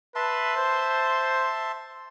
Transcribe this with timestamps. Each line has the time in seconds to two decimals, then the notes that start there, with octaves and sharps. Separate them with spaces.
0.15 B4 E5 A5 C6
0.57 C5